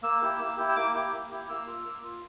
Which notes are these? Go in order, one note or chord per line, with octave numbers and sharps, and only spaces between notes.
A#3 E6
E4 G4
A#3
E4 G4
E6
A#3 D6
E4 G4
A#3
E4 G4
A#3 E6
F4
A#3
F4